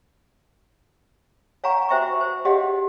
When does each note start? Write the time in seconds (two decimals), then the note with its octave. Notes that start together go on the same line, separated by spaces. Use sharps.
1.64 C#5 F5 F#5 G#5 A#5 C#6
1.89 F#4 C5 E5 G5 C#6
2.01 F#4
2.21 C5
2.45 G4 G#4 C#5 D#5 F5 F#5